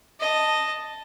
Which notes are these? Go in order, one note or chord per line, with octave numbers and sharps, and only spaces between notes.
D#5 A5